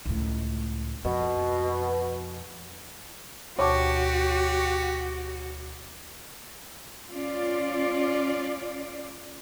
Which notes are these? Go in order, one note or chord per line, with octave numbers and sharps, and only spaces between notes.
C#2 A2
F2 B2
D2 B2 F#4 G4 C#5 A5 C#6 D6
C#4 F4 D5